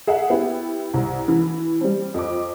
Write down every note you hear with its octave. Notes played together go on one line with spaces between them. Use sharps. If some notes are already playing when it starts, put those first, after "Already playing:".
G#4 E5 F#5
B3 E4 G4
C2
E3
G3 C4
F2 D6